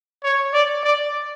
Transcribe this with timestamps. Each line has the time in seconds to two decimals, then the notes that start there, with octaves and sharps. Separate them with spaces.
0.24 C#5
0.54 D5
0.84 D5